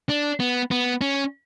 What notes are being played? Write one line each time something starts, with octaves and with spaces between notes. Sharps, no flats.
D4
B3
B3
C#4